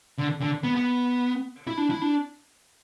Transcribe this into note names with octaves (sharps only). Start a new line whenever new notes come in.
D3
D3
B3
B3
E4
D4
E4
D4